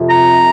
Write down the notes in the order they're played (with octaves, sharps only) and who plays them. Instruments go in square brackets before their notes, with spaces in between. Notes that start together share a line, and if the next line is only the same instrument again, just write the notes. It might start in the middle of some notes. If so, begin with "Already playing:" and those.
Already playing: [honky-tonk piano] F2 C3 F3
[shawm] A#5